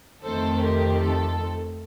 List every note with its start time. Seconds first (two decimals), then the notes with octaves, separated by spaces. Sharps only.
0.23 F2 D#3 A3 C4 A4 C5
0.61 G4 A#4
1.00 A4